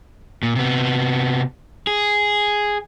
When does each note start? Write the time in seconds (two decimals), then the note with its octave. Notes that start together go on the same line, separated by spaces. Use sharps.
0.43 A#2
0.56 C3 B3
1.87 G#4